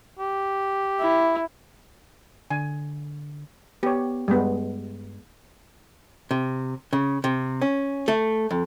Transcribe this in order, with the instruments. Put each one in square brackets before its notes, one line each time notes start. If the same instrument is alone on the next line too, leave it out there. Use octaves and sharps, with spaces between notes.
[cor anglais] G4
[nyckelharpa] E4
[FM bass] D3 [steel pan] G#5
[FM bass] B3 [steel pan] G4 C#5
[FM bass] G2 [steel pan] G3 G#3 B3
[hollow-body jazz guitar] C3
C#3
C3
C#4
A3
F2